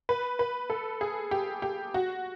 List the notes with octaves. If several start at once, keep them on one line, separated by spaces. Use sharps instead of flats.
B4
B4
A4
G#4
G4
G4
F#4